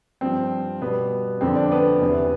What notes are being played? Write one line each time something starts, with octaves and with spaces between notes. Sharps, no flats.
G2 F3 C4
B2 G3 B3
F2 D3 F3 C4
D4
B3
E2 C3 E3